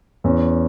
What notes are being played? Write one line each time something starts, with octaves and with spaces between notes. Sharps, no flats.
E2 C#4